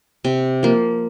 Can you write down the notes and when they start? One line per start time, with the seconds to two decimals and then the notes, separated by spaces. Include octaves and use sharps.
0.24 C3
0.63 F3 A#3